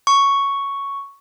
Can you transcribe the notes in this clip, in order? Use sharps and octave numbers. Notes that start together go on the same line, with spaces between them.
C#6